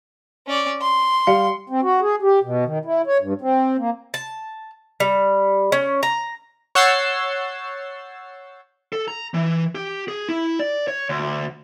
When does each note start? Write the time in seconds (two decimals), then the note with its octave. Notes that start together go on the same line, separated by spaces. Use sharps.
0.47 C#4 D5
0.81 C6
1.27 G3 F5 C#7
1.70 C4
1.82 F#4
2.02 G#4
2.22 G4
2.43 B2
2.66 D#3
2.85 E4
3.07 C#5
3.21 G2
3.41 C4
3.79 A#3
4.14 A5
5.00 G3
5.72 C#4
6.03 A#5
6.75 C#5 F#5 E6 G6 A6 C7
8.93 A4
9.08 A#5
9.34 E3
9.75 G4
10.08 G#4
10.29 E4
10.60 D5
10.88 C#5
11.09 D2